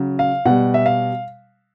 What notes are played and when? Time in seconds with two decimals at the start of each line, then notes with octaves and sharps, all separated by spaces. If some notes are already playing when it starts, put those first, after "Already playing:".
Already playing: C#3 F#3
0.19 F5
0.46 B2 G3 F#5
0.74 E5
0.86 F5